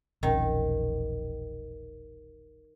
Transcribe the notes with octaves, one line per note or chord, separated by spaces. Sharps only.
E1 A#1 D#3 C#4